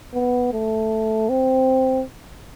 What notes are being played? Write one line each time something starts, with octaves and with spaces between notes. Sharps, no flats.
B3
A3
C4